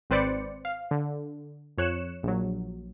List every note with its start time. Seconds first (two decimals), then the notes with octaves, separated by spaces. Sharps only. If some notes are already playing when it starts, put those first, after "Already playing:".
0.10 G#1 C4 B4 C5 D5 C#7
0.65 F5
0.91 D3
1.78 F2 C#5 F#6 C#7 E7
2.23 A#1 F#3